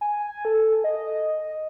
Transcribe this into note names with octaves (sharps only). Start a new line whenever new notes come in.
G#5
A4
D#5